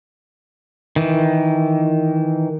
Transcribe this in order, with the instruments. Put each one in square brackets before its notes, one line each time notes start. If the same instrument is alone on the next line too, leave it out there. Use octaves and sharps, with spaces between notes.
[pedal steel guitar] D#3 E3